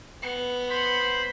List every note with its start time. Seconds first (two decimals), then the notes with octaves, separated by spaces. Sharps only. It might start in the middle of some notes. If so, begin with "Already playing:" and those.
0.22 B3
0.69 C5 B5